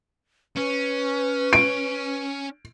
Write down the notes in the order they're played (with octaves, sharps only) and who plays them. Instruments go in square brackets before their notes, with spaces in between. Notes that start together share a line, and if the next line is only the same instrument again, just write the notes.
[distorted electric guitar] C#4 [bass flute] B4
[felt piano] D7